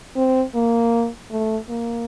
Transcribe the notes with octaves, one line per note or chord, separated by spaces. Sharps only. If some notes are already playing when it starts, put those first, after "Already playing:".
C4
A#3
A3
A#3